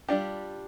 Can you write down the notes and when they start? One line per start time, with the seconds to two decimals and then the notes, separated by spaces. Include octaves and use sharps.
0.08 G3 D4 F4 G4